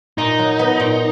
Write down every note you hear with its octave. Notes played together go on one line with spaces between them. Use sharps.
A#2 D#4
F#3
B3
A#2